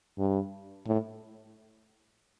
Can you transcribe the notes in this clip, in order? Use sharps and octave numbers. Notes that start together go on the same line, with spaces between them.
G2
A2